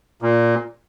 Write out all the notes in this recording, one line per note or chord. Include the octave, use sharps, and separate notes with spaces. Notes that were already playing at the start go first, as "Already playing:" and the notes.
A#2